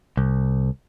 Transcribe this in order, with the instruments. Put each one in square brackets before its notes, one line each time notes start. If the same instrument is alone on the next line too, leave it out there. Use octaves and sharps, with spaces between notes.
[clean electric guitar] C2